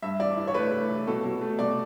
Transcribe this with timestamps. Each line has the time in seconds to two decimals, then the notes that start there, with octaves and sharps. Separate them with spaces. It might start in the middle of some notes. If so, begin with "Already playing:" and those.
0.02 G2 E5
0.19 E3 D5
0.37 E3
0.47 C#5
0.54 A3 B4
0.71 A3
0.90 E3
1.07 B2 A4
1.24 B2
1.41 A3
1.59 B2 D5